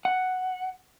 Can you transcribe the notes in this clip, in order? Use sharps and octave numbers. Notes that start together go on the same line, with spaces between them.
F#5